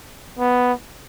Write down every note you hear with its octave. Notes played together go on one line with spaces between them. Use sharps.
B3